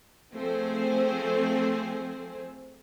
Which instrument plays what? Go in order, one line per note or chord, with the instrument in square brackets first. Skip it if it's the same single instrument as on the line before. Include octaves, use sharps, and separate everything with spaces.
[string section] F3 A3 C4 G#4 C5